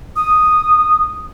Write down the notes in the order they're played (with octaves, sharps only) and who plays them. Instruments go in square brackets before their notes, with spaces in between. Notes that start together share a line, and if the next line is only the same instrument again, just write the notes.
[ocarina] D#6